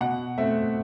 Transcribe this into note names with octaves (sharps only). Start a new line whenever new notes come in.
B2 F#5
A3 C4 E5